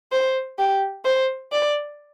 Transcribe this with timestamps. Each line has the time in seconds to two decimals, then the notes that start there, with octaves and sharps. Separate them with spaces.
0.12 C5
0.58 G4
1.05 C5
1.52 D5